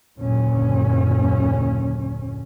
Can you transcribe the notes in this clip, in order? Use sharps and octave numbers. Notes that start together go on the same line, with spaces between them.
F#1 D#2 A#2 D3 C#4